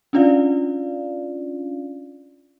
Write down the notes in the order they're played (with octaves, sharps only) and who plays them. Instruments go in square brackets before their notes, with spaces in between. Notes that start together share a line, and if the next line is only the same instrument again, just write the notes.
[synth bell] C#4 D4 F4 D5 F5